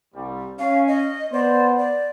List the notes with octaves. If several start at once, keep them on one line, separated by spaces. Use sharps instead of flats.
C2 G3
C#4 F5
D#5
B3 C5 D5
D5